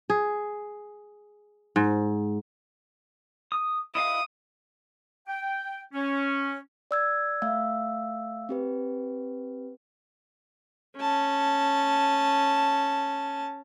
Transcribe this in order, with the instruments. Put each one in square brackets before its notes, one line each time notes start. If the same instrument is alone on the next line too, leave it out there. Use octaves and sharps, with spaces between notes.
[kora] G#4
G#2
[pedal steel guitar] D#6
[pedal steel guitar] E4 D#5 F5 [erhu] D#6
[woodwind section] G5
C#4
[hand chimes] D5 E6 G#6
A3 E5 F5 E6
C4 G4 B4
[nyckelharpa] C#4 A5